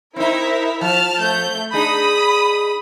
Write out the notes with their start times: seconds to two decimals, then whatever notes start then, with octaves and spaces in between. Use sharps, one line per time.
0.16 C4 D#4 E4 A#4 E5
0.81 F3 A5 F6
1.19 A3 G6
1.73 D4 D#4 G#4 B5 D#6